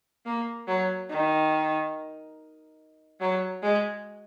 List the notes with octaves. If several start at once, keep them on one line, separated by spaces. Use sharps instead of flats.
A#3
F#3
D#3
F#3
G#3